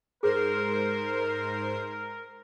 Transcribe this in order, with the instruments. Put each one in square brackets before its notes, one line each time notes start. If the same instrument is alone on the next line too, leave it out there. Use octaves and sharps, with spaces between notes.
[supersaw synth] G#2 C5 C7 [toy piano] G#4 [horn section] A#4